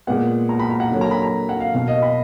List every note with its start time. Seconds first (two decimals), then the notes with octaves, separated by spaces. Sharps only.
0.07 A#2 G#3 B3 F#5
0.49 A#5
0.60 B5
0.70 A#5
0.80 F#5
0.91 D3 F#3 A#3
1.01 A#5
1.11 B5
1.22 A#5
1.49 F#5
1.60 F5
1.74 B2 A#3 F5
1.88 D#5
2.02 B5